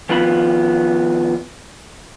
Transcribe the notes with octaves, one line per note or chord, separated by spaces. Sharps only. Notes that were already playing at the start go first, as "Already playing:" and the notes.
D#3 F3 B3 F4 B5